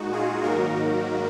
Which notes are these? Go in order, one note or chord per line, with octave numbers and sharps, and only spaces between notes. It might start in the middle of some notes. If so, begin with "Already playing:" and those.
Already playing: A#2 G#3 D#4 F#4
F4 G#4
G#2 D#3 F#3 A#3 D#4 F#4 A#4